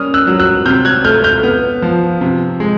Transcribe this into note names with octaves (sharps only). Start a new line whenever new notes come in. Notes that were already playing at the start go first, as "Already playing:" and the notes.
Already playing: G3 A#3 C#4 D#6 F6
E6 F#6
F#3
E6 F#6
C3 F6 G6
F#6 G#6
A3 F6 G6
F6 G6
B3
F3
C3
G#3